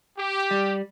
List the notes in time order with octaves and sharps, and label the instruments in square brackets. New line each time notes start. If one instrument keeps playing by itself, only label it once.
[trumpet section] G4
[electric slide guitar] G3